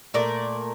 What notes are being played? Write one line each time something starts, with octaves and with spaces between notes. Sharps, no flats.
A#2 A3 A#4 D5